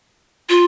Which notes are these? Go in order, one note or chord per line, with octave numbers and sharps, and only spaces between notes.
F4